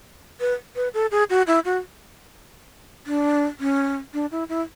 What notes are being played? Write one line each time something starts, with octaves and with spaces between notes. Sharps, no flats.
B4
B4
A4
G#4
F#4
E4
F#4
D4
C#4
D4
E4
E4